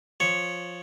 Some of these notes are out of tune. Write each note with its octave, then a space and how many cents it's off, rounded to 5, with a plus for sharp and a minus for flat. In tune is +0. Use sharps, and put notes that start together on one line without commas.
F3 +10 C#5 +0 C#6 +0